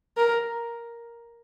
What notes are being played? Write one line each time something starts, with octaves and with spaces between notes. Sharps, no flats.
A#4